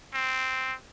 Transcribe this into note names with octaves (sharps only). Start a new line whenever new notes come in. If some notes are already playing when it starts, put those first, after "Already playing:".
C4